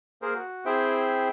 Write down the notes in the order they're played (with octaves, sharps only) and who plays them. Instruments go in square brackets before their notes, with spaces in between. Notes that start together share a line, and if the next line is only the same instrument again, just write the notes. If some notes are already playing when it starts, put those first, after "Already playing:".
[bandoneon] A#3 G#4 A#4 C5
F#4
C4 E4 G#4 C5 E5 G5